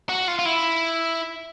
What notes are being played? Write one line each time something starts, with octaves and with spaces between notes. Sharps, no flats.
F#4
F4
F4
E4